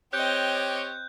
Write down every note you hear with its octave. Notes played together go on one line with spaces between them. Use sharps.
C4 G4 C#5 D#5 F#6 G6